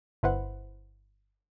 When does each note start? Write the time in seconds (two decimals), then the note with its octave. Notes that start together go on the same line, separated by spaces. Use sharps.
0.23 G1 E4 B4 C5 F#5